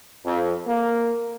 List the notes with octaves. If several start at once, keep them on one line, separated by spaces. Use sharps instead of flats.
F2
A#3